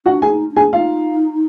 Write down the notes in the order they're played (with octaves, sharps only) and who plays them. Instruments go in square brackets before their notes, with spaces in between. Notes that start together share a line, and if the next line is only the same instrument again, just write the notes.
[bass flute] D4 [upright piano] F#4 F#5
[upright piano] G#4 G#5
[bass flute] D#4
D4
[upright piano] G#4 G#5
[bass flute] D#4 [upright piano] F4 F5